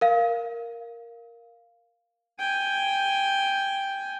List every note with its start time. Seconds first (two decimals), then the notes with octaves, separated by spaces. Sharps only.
0.01 A#4 F5
2.39 G5 G#5